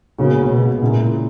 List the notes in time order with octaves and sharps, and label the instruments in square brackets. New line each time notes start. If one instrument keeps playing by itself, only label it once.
[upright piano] A#2 G#3 B3 F#4 [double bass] C#3
[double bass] B2
[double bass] A#2 [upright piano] C#3 G#3 C#4 E4 G#4